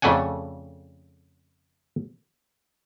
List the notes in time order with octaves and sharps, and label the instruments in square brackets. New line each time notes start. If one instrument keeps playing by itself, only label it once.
[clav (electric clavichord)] F2 C#3 A3 D4 F#5 G#5